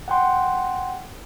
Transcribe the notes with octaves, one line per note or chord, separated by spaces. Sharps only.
F#5 G5 C6